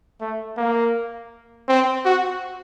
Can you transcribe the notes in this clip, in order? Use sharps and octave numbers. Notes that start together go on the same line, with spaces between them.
A3
A#3
C4
F#4